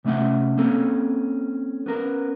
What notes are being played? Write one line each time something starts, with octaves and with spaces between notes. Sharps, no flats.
C3 A3 C#4 E5 F#5
A#3 C4 C#4 A4
B3 C#4 A#4